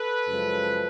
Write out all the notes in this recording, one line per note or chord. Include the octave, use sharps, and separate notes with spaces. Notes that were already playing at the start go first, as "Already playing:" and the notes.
Already playing: A4 B4
F#2 C#3 F3 G#3